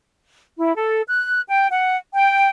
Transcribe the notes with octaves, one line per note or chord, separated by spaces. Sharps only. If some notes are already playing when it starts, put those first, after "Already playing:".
E4
A4
F#6
G5
F#5
G5